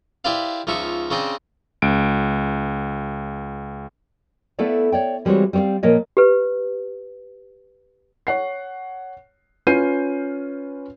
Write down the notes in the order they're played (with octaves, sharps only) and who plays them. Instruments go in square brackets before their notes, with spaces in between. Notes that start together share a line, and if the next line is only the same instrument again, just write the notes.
[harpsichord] E4 G4 B4 C5 D5 F5
C#2 F3 D#4 E5 C#6
C#3 C4 D4 C5 D#5
[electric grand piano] C#2 D7
[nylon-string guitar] A3 B3 E4 A4 D5 F5
C#5 D5 G5
E3 G3 G#3 C4 F#4 C#5
G3 C4 C#5 D5 F5
A#2 F3 A#3 C#5 D#5
[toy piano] G4 B4
[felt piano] C#5 F#5 C7
C#4 F4 B4 G6 C7 D#7